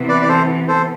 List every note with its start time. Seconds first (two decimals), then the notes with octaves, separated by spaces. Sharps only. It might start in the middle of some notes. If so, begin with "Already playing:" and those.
Already playing: C3 E3 B3
0.09 B4 D5
0.22 D5
0.29 A4 C5
0.68 A4 C5